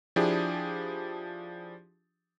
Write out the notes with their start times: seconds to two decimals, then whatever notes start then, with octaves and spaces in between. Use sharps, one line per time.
0.16 F3 D4 E4 G4 G#4